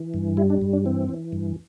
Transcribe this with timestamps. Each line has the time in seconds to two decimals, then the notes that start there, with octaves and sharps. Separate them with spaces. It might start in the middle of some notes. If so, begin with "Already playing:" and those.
Already playing: E3
0.14 G2
0.37 G3 E4
0.50 D4
0.61 G2
0.73 D4
0.85 E3 C4
1.09 E3
1.33 G2